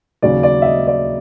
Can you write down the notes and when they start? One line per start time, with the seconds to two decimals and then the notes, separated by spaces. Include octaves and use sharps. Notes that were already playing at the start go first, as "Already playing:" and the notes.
0.22 D#2 C#3 F#3 D5
0.43 D5
0.62 E5
0.66 D#5
0.87 D5